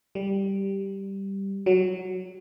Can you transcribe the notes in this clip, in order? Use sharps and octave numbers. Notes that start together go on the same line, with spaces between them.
G3
F#3